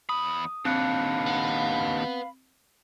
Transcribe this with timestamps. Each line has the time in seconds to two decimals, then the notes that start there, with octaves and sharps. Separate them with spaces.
0.09 E2 B5 D#6
0.65 D#2 C4 D4 F5 B5 F#6 C#7
1.27 B4 F#5